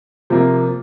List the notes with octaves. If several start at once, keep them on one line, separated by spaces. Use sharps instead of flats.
C3 F3 A#3